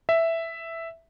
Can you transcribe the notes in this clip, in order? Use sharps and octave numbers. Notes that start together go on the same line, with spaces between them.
E5